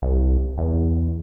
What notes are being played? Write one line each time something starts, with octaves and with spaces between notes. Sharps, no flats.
C2
E2